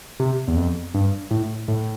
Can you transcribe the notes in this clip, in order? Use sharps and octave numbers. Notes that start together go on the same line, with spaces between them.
C3
E2
F2
G2
A2
A2